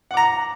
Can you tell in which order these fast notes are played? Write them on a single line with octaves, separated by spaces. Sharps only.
F#5 D6 A#5